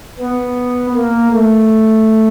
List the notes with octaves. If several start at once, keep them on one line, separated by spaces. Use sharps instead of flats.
B3
A#3
A3